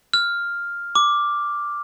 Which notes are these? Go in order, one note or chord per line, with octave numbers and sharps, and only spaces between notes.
F6
D6